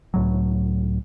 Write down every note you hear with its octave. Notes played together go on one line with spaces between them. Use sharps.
C#2 A2 F#3